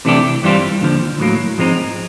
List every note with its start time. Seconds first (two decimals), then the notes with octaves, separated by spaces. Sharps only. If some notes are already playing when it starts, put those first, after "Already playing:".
0.05 C3 E3 A3 D4 G4
0.43 G2 E3 G3 C4 F4
0.81 D#2 D3 F3
1.19 A2 F#3 A#3
1.58 G#2 F3 G#3 C4 D#4